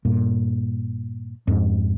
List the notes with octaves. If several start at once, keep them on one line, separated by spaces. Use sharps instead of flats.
G2 A#2
F2 G#2